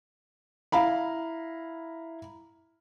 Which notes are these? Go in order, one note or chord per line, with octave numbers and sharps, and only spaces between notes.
E4 F5 A#5 B5